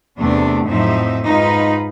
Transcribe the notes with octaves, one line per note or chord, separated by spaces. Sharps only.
E2 C3 A3 D4
F2 A2 F#3 D#4 C5 E5
G#2 D#4 F4 B4